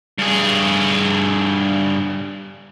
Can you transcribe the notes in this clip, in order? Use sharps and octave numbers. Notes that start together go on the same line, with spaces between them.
G2 G#4